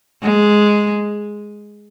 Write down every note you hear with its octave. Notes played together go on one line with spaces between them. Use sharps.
G#3